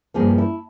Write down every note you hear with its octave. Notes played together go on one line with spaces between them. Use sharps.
G2 F3 A#3 C#4 G#4
E4